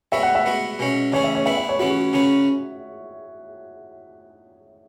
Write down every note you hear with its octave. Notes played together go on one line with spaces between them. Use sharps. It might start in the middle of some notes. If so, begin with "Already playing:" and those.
G#3 B3 F#4 C#5 E5
F#5
E5
G#3 B3 F#4
B2 G#3 C#4 F#4
C#3 E3 C#4 G#4 C#5
E5
C#5
B3 E4 G#4 B4 E5
E5
C#5
E3 C#4 E4 F#4 B4
F#4
C#3 F#3 C#4 G#4 B4